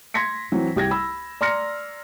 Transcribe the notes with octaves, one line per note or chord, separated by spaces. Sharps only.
C6 G#6 A#6 B6 C#7
E3 F#3 C4
C2 G4 G#6 A#6
B5 E6
D5 A#5 C6 F6 A#6 C#7